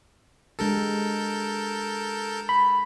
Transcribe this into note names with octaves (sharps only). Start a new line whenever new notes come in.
G#3 D4 G4 A4 A#4 G6
B5